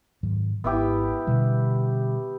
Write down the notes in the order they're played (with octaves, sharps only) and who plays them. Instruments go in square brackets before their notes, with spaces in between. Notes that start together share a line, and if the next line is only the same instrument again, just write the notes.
[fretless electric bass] G#2 D#3 F#3
[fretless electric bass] G#1 [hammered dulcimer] B3 E4 G4
[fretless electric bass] B2 D3 G3